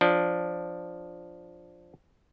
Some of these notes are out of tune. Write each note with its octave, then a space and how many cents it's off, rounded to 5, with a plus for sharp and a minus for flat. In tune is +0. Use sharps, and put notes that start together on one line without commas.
F3 +5 D4 +0